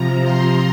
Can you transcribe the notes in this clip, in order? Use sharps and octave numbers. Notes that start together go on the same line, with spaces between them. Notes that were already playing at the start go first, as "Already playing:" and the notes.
Already playing: C3 F3 A#5
C6